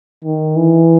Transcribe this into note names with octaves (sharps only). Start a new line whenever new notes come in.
D#3
E3